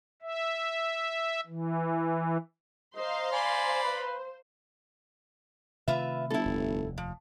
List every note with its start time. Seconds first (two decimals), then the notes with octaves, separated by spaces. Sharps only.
0.22 E5
1.47 E3
2.96 C5 D#5 F5 A#5 C6
3.32 D5 G#5 B5
3.83 B4
5.88 C3 D#3 A3 F4 B4 E5
6.30 G1 E4 A4
6.45 F1 D#2
6.98 F3